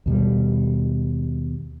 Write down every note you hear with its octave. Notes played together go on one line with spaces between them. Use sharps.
D#2 B2 G3